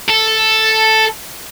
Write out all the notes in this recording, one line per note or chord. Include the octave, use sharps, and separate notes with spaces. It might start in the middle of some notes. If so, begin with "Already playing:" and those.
A4